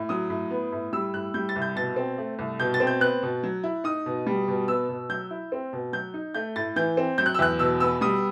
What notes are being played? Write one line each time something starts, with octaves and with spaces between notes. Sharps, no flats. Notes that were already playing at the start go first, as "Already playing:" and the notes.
Already playing: A2
F#3 D#6
A2
B3
A2
G3 E6
A2 F#6
G3 G6
A6
C2
G6
B2 A6
C4
A3
C2
B2 G6
A6
C4
G6
B3 F#6
B2
F#3
E4
D#4 D#6
B2
G3
B2
B3 E6
B2
F#3 G6
E4
C4
B2
F#3 G6
D#4
A3 G6
A2 A6
E3 G6
C4
F#3 G6
F#6
E6
E2 F#6
B2 E6
B3 E6
G3 D#6